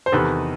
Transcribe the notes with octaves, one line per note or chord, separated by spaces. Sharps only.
C5
E2 C3 D#3 A4 B4